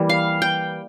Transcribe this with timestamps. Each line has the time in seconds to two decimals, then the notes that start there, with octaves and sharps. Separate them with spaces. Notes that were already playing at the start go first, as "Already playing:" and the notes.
Already playing: E3 G3 A#3
0.09 F5
0.42 G5